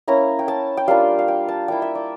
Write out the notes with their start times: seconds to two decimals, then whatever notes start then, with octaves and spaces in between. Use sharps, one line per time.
0.08 A#3 C#4 E4 A#5
0.39 G5
0.48 A5
0.77 G5
0.88 G3 A#3 D4 F4 F5
1.19 F5
1.28 G5
1.48 A5
1.68 G3 A#3 E4 G5
1.82 E5
1.95 D5